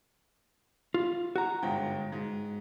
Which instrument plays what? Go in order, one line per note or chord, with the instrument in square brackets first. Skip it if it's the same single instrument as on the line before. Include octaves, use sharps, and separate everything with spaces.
[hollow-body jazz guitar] F4
F#4 A#5
[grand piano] G1 G#2 G5
G#2